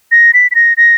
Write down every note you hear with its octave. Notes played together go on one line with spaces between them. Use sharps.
A#6
B6
B6
A#6
A#6